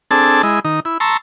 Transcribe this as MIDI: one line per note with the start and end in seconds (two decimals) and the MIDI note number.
0.11 0.42 60
0.11 0.42 62
0.11 0.42 68
0.11 0.42 69
0.11 0.42 81
0.43 0.60 56
0.43 0.60 64
0.43 0.60 75
0.65 0.80 51
0.65 0.80 63
0.85 0.98 64
1.00 1.17 81
1.00 1.17 82
1.00 1.17 84
1.00 1.17 85
1.00 1.17 88